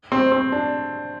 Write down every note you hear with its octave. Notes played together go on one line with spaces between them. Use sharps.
C4
C4
D4